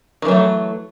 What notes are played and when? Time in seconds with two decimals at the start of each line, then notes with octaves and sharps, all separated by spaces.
0.22 D#3
0.25 E3
0.28 F#3
0.31 A3